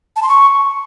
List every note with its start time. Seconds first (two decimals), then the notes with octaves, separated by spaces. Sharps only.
0.16 A5
0.22 C6
0.29 C#6